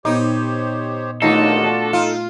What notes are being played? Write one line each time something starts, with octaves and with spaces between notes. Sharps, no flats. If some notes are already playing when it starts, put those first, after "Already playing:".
A#2 B3 D#4 G4 C5 C#5
D#2 A3 D4 D#4 F4 F#4 A4 A#6
D#4 F4